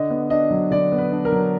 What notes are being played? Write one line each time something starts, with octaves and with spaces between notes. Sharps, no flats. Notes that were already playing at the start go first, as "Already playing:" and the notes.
Already playing: D3 D#5
B3
D4 D#5
F#3
D3 D5
B3
B4
D4
A#4
F#3